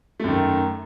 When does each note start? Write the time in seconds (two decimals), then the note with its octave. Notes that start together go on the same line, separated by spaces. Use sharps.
0.20 A3
0.24 F#2
0.28 D#3